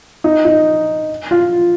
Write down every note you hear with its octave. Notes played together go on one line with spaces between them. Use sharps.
D#4
D#4
F4